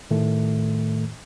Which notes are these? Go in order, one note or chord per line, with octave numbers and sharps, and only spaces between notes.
A2 D#3 A3